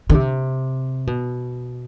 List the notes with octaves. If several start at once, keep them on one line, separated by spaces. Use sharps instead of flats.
D3
C3
B2